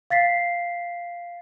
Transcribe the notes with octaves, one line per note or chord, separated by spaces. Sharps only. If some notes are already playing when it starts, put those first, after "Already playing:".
F5 A6 B6 C7